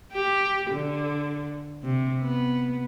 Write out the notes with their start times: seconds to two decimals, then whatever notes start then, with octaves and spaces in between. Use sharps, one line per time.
0.13 G4
0.71 D3
1.84 C3
2.23 B3